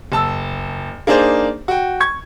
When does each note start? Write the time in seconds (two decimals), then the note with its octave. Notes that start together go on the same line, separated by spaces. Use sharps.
0.12 F#1 A5 E6
1.07 A#3 D4 D#4 G#4 C5 D5
1.68 F#4 G5
2.00 C#6 G#6